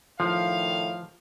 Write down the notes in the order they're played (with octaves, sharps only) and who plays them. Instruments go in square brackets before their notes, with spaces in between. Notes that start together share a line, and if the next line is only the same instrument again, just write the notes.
[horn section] A2 D#3 F5 [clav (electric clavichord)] F3